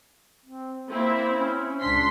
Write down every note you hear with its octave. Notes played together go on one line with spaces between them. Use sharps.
C4
A#3 C4 E4
C#4
C#2 D4 C6 B6